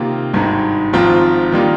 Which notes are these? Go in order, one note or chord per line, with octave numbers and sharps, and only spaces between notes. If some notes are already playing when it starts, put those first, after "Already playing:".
Already playing: C3 D#3 A#3 F4
G#1 G2 D#3 G#3
G#1 G#2 F3 C4 F4
D#3 G3 A#3 F4